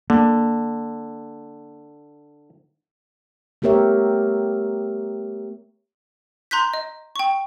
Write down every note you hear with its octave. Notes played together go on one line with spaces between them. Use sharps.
D3 A#3
A3 B3 G4 A#4 C#5 E5
A#5 C6 F#6 G6 B6
D#5
G5 C#6